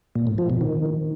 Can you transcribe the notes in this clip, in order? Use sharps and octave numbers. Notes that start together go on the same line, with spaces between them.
A#2
A2
F3
B2
D#3